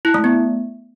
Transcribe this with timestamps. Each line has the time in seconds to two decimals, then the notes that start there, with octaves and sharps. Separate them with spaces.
0.05 E4
0.14 A3
0.24 B3